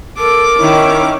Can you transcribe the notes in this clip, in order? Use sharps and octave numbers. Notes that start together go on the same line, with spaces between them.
A4 A#4 D6
D#3 C#4 E4